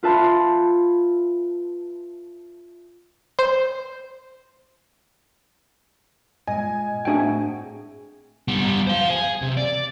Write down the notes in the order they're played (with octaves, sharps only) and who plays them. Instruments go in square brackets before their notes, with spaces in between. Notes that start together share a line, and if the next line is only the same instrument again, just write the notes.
[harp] F4 B4 E5 A5 B5 C6
[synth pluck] C5
[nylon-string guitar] A#2 G#3 [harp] D#5 [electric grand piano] G#5
[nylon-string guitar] A2 C4 F#4 [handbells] A3 D4 G5 [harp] G#4 D7
[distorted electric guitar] G3 B3
C5 F5
G#4
C3
D5